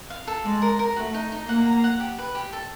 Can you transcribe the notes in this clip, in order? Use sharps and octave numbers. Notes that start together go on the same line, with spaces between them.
F5
A4
G#3 D5
A#4
A#4
A3 F#4
D#4
D#4
A#3 F#5
A#5
F#5
G4
B4
G4
A4